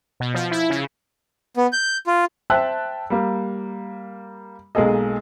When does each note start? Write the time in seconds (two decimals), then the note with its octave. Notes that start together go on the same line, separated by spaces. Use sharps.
0.20 B2
0.34 F3
0.51 E4
0.70 C#3
1.57 B3
1.73 G6
2.07 F4
2.50 C5 E5 G5 A5 E6 F#6
3.10 G3 A#3
4.75 B1 G#3 A#3 G#4 A4 D#5